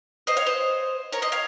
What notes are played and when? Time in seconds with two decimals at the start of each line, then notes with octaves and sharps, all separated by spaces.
0.27 C5 D#5
0.37 C#5 F5
0.46 C5 D#5
1.12 A#4 C#5
1.22 C5 D#5
1.32 C#5 F5